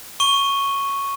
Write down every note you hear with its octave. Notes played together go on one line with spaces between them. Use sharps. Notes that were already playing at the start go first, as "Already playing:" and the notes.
C#6 D#7 G7